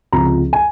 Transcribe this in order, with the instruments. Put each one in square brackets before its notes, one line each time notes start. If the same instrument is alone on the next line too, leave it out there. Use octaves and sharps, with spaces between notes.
[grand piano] C#2 C3 F3 A#5
G#5